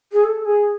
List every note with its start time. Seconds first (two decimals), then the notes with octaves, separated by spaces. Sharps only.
0.12 G#4
0.24 A4
0.45 G#4